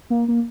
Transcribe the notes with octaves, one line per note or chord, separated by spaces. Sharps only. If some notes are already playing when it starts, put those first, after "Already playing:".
A#3
A#3